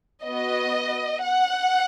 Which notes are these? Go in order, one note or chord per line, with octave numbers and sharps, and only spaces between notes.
B3 F#4 D#5
F#5